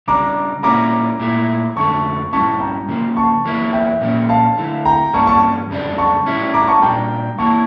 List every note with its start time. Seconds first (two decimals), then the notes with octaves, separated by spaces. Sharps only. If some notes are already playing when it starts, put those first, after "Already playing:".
0.08 C#3 G3 D4 A#5 D6
0.63 A#2 G3 A#3 C#4 E4 A#5 D6
1.20 A#2 A3 E4
1.76 F2 D3 A3 A5 C#6
2.33 G2 D3 G3 C#4 E4 A5 C#6
2.60 G5 A#5
2.89 C#3 F3 A#3
3.17 A5 C#6
3.45 E2 E3 A#3 E4
3.73 E5 G5
4.01 A#2 F3 A#3 C#4
4.29 F5 A5
4.58 D3 A3 E4
4.85 G5 A#5
5.13 G2 E3 G3 A#3 C#4 A5 C#6
5.27 A5 C#6
5.70 F2 C#3 G3 D4
5.98 A5 C#6
6.26 A2 G3 C#4 E4
6.54 A#5 D6
6.68 A5 C#6
6.82 A#2 G3 D4 F4 G5 A#5
7.38 E3 A#3 E4 A5 C#6